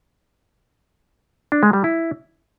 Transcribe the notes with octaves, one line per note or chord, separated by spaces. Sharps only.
D4
G#3
G3
E4